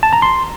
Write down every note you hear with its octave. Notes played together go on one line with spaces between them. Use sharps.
A5
A#5
C6